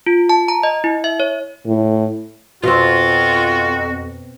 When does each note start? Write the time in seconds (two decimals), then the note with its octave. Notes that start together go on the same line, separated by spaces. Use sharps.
0.06 F4
0.29 A5
0.48 A#5
0.63 D#5
0.84 E4
1.04 E5
1.20 C#5
1.66 A2
2.63 F2 B2 C4 F4 F#4